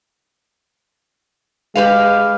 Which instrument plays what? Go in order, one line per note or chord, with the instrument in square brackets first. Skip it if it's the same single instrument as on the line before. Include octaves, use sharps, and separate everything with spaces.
[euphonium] G#3 [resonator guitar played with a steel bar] G4 B4 F5